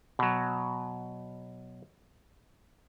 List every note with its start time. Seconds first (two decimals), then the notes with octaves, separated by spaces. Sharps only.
0.19 B2 F#3